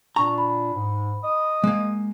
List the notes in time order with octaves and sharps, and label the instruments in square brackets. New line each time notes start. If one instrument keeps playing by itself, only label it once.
[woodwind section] A#2 D4 [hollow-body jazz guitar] A#5 [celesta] C#6
[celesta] B5
[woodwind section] G#2
D#5 D#6
[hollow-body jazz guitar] G#3 A#3